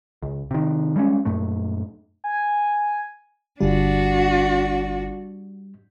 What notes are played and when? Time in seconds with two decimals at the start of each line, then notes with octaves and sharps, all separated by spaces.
0.22 C#2
0.51 C3 D#3
0.96 G3 G#3 C4 C#4
1.25 F#2 A#2 A3
2.24 G#5
3.60 G1 D3 G3 D4 F4 F#4